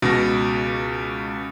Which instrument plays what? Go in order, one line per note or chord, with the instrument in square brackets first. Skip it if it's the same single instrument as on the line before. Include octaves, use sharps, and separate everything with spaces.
[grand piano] C#2 [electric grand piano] B2 A#6